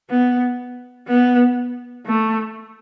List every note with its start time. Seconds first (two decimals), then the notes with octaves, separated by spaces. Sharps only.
0.10 B3
1.08 B3
2.06 A3